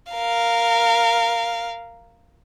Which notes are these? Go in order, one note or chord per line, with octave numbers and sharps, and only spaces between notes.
A#4 F5